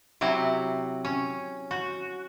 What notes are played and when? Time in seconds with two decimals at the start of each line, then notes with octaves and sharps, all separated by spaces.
0.21 C3 F#3 E4
1.05 C#4
1.71 F#4